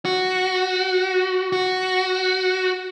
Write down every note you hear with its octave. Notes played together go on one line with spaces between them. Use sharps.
F#4
F#4